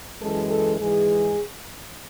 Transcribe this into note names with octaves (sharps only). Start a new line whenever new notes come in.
F#2 E3 G#3 A4
A4
G#2 E3 G#3 G#4